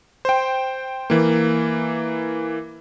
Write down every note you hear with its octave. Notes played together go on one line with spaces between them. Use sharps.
C5 G5
E3 A#3